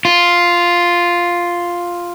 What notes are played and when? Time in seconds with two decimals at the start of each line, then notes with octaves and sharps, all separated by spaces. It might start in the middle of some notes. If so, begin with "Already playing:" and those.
0.05 F4